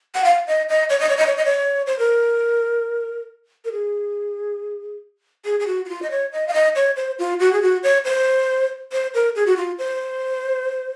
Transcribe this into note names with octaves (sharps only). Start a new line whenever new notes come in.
F#5
F5
D#5
D#5
C#5
D#5
C#5
D#5
C#5
D#5
C#5
C5
A#4
A#4
G#4
G#4
G#4
F#4
F#4
F4
D#5
C#5
D#5
F5
D#5
C#5
C5
F4
F#4
G#4
F#4
C#5
C5
C5
A#4
G#4
F#4
F4
C5